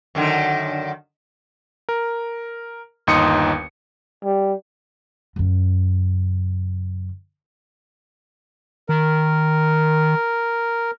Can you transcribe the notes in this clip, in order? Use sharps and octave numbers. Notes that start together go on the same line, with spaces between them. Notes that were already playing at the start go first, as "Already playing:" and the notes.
F#2 D3 D#3
A#4
G1 D#2 D#4 C6 D#6 C#7
G3
F#2 C#3
D#3 A#4